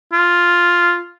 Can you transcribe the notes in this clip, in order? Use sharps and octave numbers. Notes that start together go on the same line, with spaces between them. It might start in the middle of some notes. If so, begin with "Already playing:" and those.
F4